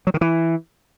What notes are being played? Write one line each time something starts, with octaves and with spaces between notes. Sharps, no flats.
F#3
D#3
E3